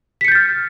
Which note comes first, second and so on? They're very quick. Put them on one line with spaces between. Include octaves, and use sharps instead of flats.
B6 C#7 G6 A6 F6